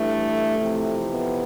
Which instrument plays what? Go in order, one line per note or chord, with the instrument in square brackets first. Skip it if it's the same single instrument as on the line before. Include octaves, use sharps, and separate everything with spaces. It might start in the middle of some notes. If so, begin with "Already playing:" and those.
Already playing: [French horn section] G2 E3 A3
F2 C3 E3
B3